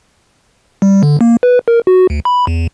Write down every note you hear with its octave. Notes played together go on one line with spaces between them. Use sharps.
G3
D3
A#3
B4
A#4
F#4
D2
B5
E2